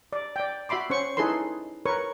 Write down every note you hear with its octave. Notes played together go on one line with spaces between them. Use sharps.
D5
D5 G5
F#4 E5 B5 C6 D6
C#4 C5 C#6
D#4 E4 G#4 A4 B4 C6
A#4 B4 C#5 C#6